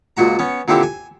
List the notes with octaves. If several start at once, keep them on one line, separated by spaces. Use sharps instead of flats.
C#2 A#2 F#4 A#5
B3 C#4
A#2 D3 C4 E4 G4
G#5